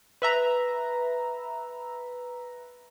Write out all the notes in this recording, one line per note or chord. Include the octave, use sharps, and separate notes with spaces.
B4 E5 A#5